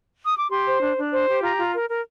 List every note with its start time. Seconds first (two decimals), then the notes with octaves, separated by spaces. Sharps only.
0.24 D#6
0.36 D6
0.49 G4 C6
0.65 C5
0.81 D4
0.96 D4
1.11 C5
1.27 G4
1.42 F4 A#5
1.57 F4
1.73 A#4
1.88 A#4